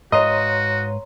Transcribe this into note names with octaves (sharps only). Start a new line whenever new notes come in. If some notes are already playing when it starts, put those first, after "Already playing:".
G#2 F#4 B4 C#5 D#5 F5 A#5 C6